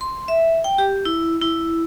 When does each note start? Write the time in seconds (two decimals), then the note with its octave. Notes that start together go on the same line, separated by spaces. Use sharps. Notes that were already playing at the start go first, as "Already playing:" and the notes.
0.01 C6
0.28 E5
0.64 G5
0.78 G4
1.05 E4
1.42 E4